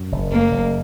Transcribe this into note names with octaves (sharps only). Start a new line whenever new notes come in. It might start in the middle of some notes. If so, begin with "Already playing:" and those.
Already playing: F#2
F#1
F#2 A#3
F#1